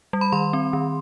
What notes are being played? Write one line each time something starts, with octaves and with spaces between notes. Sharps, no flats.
G3
B5
D#3 C6
C4
D#3